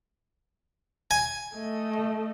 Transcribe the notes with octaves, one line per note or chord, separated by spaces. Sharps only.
G#5
A3 D#5